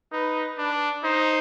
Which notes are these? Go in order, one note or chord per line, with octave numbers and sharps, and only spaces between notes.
D#4 B4
D4
D#4 C5